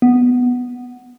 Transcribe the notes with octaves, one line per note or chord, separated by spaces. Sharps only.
B3